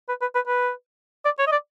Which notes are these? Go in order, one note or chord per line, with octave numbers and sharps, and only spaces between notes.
B4
B4
B4
B4
D5
C#5
D#5
D5